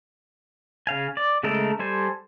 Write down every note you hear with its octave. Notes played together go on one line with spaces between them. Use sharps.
C#3 F5 G#5
D5
C#3 G#3 A3 A4 A#4
G3 A4 C5 G#5